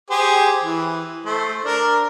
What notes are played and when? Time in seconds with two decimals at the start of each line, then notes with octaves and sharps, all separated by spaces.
0.10 G4 G#4 C5
0.63 E3
1.25 A3 C5
1.65 D4 A#4